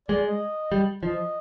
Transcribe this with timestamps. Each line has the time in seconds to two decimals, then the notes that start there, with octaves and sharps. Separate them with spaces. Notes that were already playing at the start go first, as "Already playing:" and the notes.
0.08 G#3 D5
0.24 D#5
0.72 G3
1.03 F3 D#5